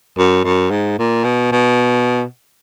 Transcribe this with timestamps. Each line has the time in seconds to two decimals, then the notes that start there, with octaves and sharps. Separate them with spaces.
0.18 F#2
0.44 F#2
0.71 G#2
0.99 A#2
1.24 B2
1.52 B2